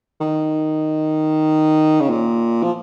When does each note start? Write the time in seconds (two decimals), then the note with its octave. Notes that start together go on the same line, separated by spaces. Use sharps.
0.21 D#3
2.00 C#3
2.09 A#2
2.63 F3